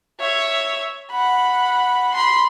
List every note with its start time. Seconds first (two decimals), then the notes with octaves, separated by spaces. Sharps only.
0.20 C#5 E5
1.11 F#5 B5
2.14 B5 C6